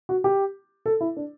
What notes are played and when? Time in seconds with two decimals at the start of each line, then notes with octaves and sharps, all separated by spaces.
0.09 F#4
0.24 G4
0.86 A4
1.01 E4
1.17 D4